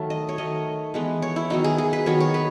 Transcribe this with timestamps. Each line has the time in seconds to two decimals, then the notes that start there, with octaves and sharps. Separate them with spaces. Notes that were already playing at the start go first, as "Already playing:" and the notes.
Already playing: D#3 F#3 A3
0.10 D#5
0.29 C#5
0.38 D#3 A3 D#5
0.94 E3 G#3 B3
1.22 C#5
1.36 E4
1.50 D#3 F#3 B3 D#4
1.64 G#4
1.78 G#4
1.93 B4
2.06 D#3 F#3 B3 C#5
2.20 C#5
2.34 B4